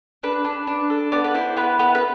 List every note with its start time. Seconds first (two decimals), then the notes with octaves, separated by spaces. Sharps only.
0.23 D4 B4
0.45 D4
0.67 D4
0.90 A4
1.12 B3 D5
1.24 B4
1.34 E4 C5
1.57 B3 B4
1.79 B3 B4
1.95 B4